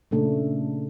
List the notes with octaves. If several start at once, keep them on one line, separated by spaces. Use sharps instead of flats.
A#2 C#3 A3 D4